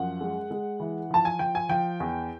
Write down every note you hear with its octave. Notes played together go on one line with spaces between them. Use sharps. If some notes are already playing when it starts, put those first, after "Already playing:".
Already playing: F#2 F3 F#5
G#3
G#3
E3
F3 A5
G#5
F3 G5
G#5
F3 G5
E2